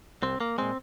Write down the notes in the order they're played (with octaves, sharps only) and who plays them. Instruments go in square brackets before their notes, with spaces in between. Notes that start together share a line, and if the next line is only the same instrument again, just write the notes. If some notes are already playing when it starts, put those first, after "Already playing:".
[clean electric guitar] C2 C4
A#3
A#2 G#3 C4